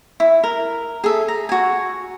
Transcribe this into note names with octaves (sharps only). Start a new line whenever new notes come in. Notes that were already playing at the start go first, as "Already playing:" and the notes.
E4
A#4
G#4 A4 E5
A#5
F#4 G#5